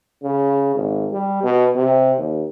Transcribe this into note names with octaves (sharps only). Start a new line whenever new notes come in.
C#3
G#1
G3
B2
C3
D#2